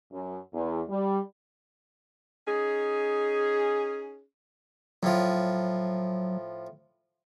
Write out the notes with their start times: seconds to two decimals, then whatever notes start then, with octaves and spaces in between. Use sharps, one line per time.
0.12 F#2
0.53 E2
0.89 G3
2.46 C#4 D#4 G#4
5.03 A2 F3 F#3